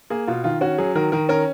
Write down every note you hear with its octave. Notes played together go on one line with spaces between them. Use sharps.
A#3 G#4
B2 F4
D#3 F4
C#4 F#4
F#3 G#4
D#3 A#4
D#3 A#4
C#4 A#4